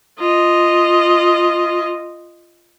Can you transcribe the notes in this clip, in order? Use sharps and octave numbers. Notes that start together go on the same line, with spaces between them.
F4 D#5